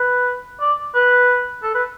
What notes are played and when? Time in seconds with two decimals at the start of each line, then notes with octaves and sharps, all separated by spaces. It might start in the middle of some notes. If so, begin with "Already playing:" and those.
Already playing: B4
0.61 D5
0.95 B4
1.63 A4
1.75 B4